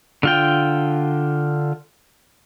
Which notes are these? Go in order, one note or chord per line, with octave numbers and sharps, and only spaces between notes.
D3 F4 G5